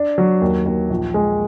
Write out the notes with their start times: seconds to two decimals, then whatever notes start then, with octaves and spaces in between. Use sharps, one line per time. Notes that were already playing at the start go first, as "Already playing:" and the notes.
Already playing: D4
0.18 F#3
0.42 D#2
0.66 D#2
0.90 A#1
1.14 G#3